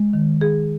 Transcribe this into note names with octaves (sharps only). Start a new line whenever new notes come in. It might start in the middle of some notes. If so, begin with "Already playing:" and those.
Already playing: G#3
D#3
G#4